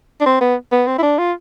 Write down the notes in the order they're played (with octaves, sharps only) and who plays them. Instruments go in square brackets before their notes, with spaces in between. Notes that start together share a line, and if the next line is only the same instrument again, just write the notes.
[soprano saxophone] D4
C4
B3
B3
C4
E4
D4
F4